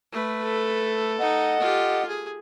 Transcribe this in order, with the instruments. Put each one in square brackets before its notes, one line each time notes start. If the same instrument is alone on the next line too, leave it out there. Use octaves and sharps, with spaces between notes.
[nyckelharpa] A3 B4
[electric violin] A4
[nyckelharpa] D#4 [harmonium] D#5 F#5
[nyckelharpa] F4 G4
G#4